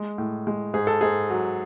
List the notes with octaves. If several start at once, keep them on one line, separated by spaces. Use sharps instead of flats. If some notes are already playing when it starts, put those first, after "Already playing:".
Already playing: G#3
A2
G#3
G#2 G#4
A4
G#2 G#4
F#3